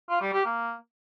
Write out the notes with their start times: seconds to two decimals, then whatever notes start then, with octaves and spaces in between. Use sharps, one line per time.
0.09 F4
0.21 G3
0.33 G4
0.45 A#3